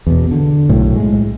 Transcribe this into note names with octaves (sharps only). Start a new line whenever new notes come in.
E2 B2
D3
B1 A2
G#3